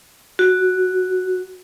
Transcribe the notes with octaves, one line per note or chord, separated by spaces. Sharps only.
F#4